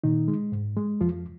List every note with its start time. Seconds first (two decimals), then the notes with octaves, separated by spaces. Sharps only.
0.04 A#2 D#3 D#4
0.28 G#3
0.52 G#2
0.77 G#3
1.01 F2 F3 F4